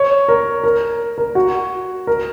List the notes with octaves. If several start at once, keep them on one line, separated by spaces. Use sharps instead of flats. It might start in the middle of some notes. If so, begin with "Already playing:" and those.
Already playing: C#5
A#4
A#4
A#4
F#4
A#4